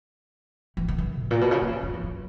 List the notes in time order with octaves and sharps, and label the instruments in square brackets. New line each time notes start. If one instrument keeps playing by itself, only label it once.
[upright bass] E3
D#3
E3
G#2
A#2
B2
C#3
D#3
C#3
F#2
E2
F#2